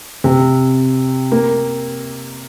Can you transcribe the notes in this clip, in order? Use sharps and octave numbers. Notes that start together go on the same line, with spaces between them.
C3
A#3